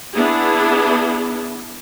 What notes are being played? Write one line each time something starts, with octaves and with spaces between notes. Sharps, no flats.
B3 D4 E4 G#4